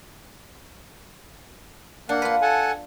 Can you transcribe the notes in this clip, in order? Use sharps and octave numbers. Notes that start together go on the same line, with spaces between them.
A#3 D4 F#5
F4 B4
A4 F#5 G#5